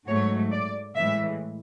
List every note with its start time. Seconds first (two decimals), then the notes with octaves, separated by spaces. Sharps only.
0.08 G#2 F#3 A3 C#5
0.51 D5
0.96 A2 E3 G#3 E5